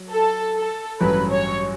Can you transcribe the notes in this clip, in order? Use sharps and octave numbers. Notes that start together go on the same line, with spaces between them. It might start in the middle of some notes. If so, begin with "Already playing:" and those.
Already playing: F#3
A4
A4
A1 G2 F#3 C#4 B4
C#5